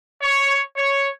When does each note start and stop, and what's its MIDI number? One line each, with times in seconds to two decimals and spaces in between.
0.21 0.61 73
0.77 1.08 73